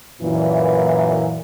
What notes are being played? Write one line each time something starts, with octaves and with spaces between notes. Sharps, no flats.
F#2 A#2 E3